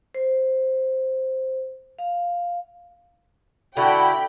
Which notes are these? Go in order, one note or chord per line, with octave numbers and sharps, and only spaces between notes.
C5
F5
D3 E4 F#4 G5 B5